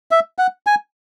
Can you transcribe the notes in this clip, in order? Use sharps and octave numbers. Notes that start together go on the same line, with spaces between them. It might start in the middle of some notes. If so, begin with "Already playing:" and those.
E5
F#5
G#5